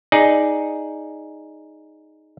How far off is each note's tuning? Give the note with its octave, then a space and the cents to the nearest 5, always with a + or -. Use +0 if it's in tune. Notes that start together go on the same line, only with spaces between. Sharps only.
D#4 +0 G#4 +0 D5 +5